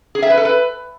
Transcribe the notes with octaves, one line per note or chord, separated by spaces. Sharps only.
G#4
E5
B4
A4
B4